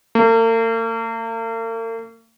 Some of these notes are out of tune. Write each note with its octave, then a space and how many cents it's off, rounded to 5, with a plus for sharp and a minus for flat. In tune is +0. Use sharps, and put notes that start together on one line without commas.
A#3 -45